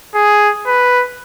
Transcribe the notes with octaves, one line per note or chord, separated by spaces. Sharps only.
G#4
B4